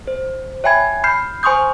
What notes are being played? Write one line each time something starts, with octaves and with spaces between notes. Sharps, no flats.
C5
C#5 E5 G5 G#5 B5 G#6
B5 F6 G6 C7
C5 G#5 C6 C#6 D#6 G6